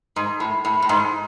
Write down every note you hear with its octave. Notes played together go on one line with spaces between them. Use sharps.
G#2
A2
A2
A2
G#2